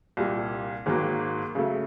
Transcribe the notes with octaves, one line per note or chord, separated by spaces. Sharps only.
C2 A#2 G3
G#1 G#2 D#3 F#3 A#3
C#3 F#3 A3